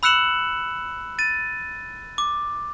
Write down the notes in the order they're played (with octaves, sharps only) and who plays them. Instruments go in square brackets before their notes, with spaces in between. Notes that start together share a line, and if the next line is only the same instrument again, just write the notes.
[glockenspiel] B5 E6 F#6 C#7 E7 F#7
A6 D#7
D6